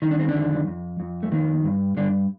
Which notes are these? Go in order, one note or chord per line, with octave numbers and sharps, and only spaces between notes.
D#3 D#4
D4
C4
D3 D4
F2
F2
F2
A3
D#3 A#3
G2
G2 D3 D4